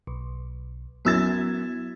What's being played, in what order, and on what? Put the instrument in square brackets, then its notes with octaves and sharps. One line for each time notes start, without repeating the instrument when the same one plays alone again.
[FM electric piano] B1
[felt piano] F#2 E6 A6 [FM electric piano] B3 E4 G#6